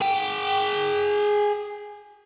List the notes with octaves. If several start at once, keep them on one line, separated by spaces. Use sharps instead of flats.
G#4 G5